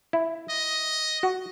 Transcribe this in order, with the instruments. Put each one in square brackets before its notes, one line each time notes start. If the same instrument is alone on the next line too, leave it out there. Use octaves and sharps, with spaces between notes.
[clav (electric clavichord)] E4
[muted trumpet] D#5
[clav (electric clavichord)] F#4